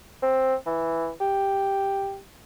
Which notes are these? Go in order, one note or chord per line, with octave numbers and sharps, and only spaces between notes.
C4
E3
G4